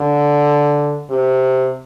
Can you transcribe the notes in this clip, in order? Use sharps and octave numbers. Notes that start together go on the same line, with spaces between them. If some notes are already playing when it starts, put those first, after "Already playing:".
Already playing: D3
C3